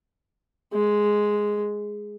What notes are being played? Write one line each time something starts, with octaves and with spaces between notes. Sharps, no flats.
G#3